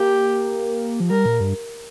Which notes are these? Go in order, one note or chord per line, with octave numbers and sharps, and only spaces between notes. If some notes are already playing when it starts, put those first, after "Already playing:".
Already playing: A#3 G4
F3
G3 A#4
A#2
G2